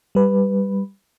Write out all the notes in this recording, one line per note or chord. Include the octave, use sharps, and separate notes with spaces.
G3 B4